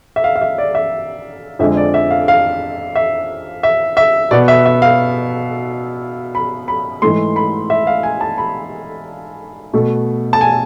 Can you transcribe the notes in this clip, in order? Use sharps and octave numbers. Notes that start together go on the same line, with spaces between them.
E5
F5
F5
E5
D5
E5
F2 D3 G#3 E5
D5
E5
F5
F5
E5
E5
E5
B2 B3 D5
E5
E5
F5
B5
B5
G#2 E3 A3 C6
B5
E5
F5
G#5
A5
B5
B2 A3
A5
G#5